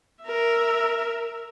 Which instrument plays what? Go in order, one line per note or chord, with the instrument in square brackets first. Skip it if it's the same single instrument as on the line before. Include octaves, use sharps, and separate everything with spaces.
[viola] A#4 E5